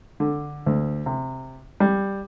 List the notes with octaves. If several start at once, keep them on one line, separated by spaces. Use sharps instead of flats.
D3
D2
C3
G3